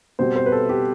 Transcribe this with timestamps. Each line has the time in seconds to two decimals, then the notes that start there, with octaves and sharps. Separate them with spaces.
0.19 B2 G3 C4 C5
0.36 C5
0.46 B4
0.52 A4
0.69 G4